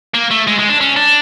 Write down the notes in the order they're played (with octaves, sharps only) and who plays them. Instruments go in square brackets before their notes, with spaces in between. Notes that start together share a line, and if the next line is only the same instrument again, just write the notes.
[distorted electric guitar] A#3
A3
G#3
G#3
D4
C#4
D4